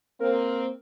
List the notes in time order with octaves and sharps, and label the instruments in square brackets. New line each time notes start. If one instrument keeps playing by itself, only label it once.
[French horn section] A#3 C4 [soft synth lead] A#4